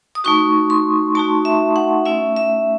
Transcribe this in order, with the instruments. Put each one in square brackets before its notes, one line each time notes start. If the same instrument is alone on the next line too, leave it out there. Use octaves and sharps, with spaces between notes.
[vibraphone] D#6
A3 D#4 F#4 C#6
C6
A3 D#4 F#4 A5
E5
F#5
A3 C#4 E4 E5
E5